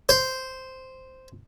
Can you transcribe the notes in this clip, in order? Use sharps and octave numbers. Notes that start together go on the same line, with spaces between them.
C5